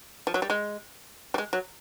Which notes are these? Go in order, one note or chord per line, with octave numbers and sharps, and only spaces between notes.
F3
F#3
G3
G#3
G3
G#3
F#3